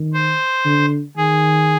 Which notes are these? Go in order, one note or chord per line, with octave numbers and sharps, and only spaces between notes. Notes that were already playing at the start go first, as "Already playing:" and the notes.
Already playing: D#3
C5
D3
D#3 G#4